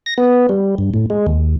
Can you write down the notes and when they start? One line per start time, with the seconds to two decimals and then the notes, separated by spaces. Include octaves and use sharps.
0.06 A#6
0.18 B3
0.49 G3
0.78 G2
0.94 A2
1.10 G#3
1.27 D#2